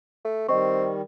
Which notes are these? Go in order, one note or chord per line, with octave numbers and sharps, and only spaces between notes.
A3
D#3 G3 C4 D#5 C#6